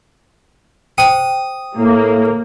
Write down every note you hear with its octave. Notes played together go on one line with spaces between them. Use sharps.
C5 G5 D#6
A2 A#3